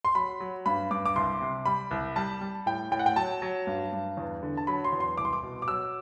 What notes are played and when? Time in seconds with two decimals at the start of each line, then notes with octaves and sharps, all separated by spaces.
0.05 C6
0.15 F#3 B5
0.40 F#3
0.66 G2 B5
0.91 G2 D6
1.06 D6
1.16 C2 C6
1.41 C3
1.66 G3 B5
1.91 C2
2.16 G3 A5
2.41 G3
2.66 A2 G5
2.91 A2 G5
2.99 F#5
3.06 G5
3.16 F#3 A5
3.42 F#3
3.67 G2
3.92 G2
4.17 E2
4.42 D3
4.57 A5
4.67 F#3 B5
4.84 C6
4.93 E2
5.00 C6
5.18 C2 D6
5.25 C6
5.33 D6
5.43 B2
5.62 D6
5.68 F#3 E6